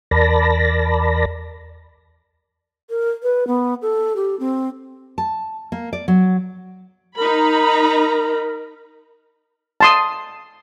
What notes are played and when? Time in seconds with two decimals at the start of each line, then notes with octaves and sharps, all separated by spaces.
0.11 E2 A#4 D5 A5 B5 A#6
2.90 A#4
3.23 B4
3.47 B3
3.82 A4
4.16 G4
4.40 C4
5.18 A5
5.72 A#3
5.93 D5
6.08 F#3
7.18 D#4 A#4 A#5 B5
9.81 A5 C6 D#6